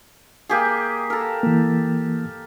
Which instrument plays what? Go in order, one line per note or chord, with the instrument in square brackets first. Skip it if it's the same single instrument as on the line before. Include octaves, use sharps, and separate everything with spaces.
[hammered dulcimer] A#3 G4 G#4
A4 A#4
[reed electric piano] E3 A#3